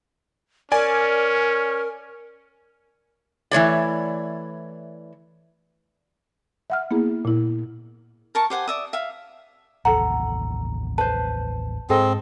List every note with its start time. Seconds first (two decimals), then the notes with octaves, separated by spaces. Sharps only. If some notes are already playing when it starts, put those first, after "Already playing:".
0.72 C#4 A#4 D5 G#5
3.51 E3 A3 C#5 D5
6.70 E5 F#5 F6
6.91 A#3 B3 E4 G#4
7.25 A#2 E4
8.35 A#4 A5 C#6
8.50 G4 C5 F#5 G#5
8.68 D5 E5 D#6
8.93 E5 F5
9.85 A1 D#2 A4 F#5 A#5
10.98 B4 C5 A5
11.90 G#2 C4 G#4 A4 D#5